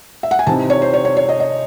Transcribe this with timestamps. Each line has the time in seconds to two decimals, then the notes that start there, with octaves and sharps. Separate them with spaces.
0.23 E5
0.31 F#5
0.39 G#5
0.47 C3 E3 C4 D#4 A5
0.70 C#5
0.82 C5
0.94 C#5
1.05 C#5
1.17 C#5
1.29 D#5
1.40 D#5